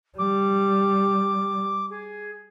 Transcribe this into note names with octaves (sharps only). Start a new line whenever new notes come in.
G3 D6
G#4